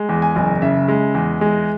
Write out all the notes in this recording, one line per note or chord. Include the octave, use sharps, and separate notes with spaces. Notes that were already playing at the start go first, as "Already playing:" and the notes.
Already playing: G#3
E2
G#5
F#1
C#3 E5
G#3
E2
G#3